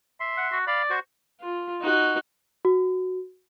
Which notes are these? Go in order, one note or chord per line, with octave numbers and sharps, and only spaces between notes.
E5 C6
F#5
F#4
D5 F5 B5
F#4 C5 C#6
F4
D#4 F#4
F#4